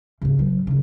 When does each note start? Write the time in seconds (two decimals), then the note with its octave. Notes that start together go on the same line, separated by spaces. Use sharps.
0.21 G#2 C#3
0.39 F#3
0.67 C#3 E4